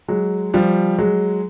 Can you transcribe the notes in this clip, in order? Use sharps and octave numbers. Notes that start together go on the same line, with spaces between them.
F#3 G#3
F3 G3
F#3 G#3